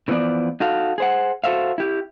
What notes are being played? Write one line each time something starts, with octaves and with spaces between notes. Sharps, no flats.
C#3 E3 F3 B3 D5
D#4 F#4 A4 F5
G#4 C5 F#5
F#4 A4 C5 E5 F5
E4 G4